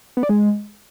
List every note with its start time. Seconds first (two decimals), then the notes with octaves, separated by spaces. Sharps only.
0.17 B3
0.23 D5
0.29 G#3